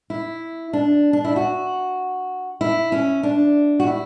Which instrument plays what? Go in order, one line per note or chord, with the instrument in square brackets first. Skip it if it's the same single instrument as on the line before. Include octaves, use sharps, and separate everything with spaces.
[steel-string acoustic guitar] E4
D4
D4
E4
F#4
E4
C#4
D4
F#4
E4